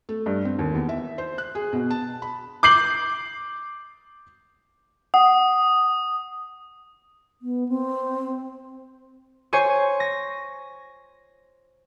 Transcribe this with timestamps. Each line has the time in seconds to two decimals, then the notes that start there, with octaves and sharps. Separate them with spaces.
0.09 A3
0.26 G2
0.45 C4
0.59 D#2
0.74 E2
0.89 E5
1.18 C5
1.38 F#6
1.55 G#4
1.73 B2
1.91 A5
2.22 B5
2.63 D6 G6 C7 F#7
5.14 F#5 D#6
7.42 B3
7.69 C4
9.53 C5 C#5 G#5 C#6
10.00 A#6